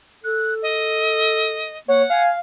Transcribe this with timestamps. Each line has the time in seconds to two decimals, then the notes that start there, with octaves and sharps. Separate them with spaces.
0.24 A4 F#6
0.62 D#5
1.88 A#3 C#5 F#5
2.10 F5 G#5